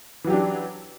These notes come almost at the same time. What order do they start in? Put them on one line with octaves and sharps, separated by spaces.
E3 F#3 G4 D4